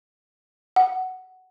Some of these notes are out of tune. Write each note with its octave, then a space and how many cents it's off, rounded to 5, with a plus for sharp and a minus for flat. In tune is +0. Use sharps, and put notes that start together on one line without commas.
F#5 +10